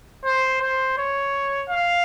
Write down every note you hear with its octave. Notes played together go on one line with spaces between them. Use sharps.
C5
C5
C#5
F5